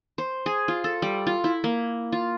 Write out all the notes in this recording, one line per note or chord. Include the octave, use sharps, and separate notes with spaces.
C5
G#4
F4
A4
G3
F4
E4
A#3
F4